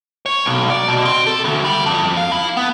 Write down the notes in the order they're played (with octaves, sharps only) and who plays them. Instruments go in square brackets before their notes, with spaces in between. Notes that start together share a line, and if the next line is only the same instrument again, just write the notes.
[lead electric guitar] C#5
B1
D5
B2
C4
A4
D2
G3
F2
F5
E4
B3